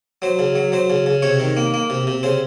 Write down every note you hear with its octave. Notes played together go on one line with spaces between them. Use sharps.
F#3 C5
C#3
F#3
F#3 C5
C#3
C#3
C3 C#5
D#3
A#3
A#3
C3
C3
C#3 C5